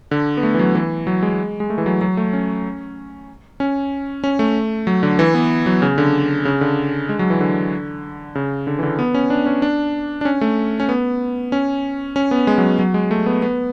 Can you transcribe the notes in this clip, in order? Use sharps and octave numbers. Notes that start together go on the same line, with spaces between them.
D3
B3
A3
E3
F#3
E3
F#3
G#3
G#3
A3
E3
F#3
F#3
A3
C#4
C#4
C#4
A3
F#3
D3
E3
B3
F#3
C#3
D3
C#3
D3
G#3
F#3
E3
D3
C#3
D3
E3
D3
B3
C#4
D4
C#4
D4
D4
C#4
A3
C#4
B3
C#4
C#4
B3
G#3
F#3
F#3
G#3
A3
B3
B3